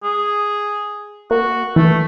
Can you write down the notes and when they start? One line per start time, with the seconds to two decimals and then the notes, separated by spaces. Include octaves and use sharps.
0.04 G#4
1.31 A#3 F#4
1.76 E3 A3